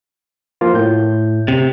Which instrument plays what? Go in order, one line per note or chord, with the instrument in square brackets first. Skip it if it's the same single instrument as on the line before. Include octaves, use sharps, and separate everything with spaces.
[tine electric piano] F3 A#3 F4
A2 G6
[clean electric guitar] C3